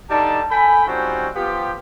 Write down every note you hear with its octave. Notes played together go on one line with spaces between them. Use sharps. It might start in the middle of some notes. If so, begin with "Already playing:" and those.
D3 G3 D#4 A5
A4 G5 G#5 B5
G3 C4 C#4 D#4 F4 F#4
F3 B3 F4 G4